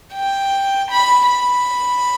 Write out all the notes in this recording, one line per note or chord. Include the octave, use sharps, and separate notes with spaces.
G5
B5
B5